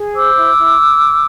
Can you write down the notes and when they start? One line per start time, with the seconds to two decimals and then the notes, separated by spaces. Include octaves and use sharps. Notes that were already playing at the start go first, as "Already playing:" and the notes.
Already playing: G#4
0.14 C5 D6 E6
0.36 E4
0.57 E4